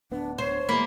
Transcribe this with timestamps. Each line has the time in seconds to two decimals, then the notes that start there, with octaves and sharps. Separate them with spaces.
0.11 D1 B3 D4
0.38 C5 C#5
0.69 B2 E3 G#3 A#3 B5